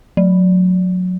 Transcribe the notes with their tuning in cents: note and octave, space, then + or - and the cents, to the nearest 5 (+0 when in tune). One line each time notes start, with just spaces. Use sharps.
F#3 -25